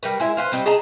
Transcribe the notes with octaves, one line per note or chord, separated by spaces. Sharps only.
G3 A#4 B4
G#3 E4 E5
B4 C5 F5
G3 C4 D#5
G#4 D#5 A5 A#5